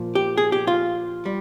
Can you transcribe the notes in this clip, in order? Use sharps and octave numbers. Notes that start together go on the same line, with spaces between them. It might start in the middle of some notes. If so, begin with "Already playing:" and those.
Already playing: A#2 F3
G4
G#4
G4
F4
G3